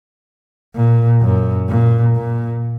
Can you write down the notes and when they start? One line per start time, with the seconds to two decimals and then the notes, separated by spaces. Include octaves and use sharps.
0.75 A#2
1.21 F#2
1.69 A#2
2.16 A#2